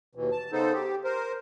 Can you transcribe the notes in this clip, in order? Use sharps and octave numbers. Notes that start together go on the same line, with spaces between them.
D#2 B2 E3
A5
C#3 B3 D#4 A4 C5
G4
A#4 C5